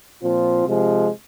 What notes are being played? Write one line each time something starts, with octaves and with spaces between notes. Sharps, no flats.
A#2 F3 C4 F4
C3 F3 G#3